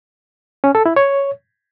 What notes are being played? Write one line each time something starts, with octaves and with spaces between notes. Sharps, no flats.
C#4
A4
E4
C#5